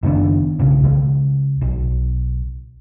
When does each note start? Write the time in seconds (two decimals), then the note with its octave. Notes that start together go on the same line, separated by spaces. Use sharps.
0.03 F#1 D#3 B3 D4
0.59 B1 C#3
0.83 C#2
1.61 B1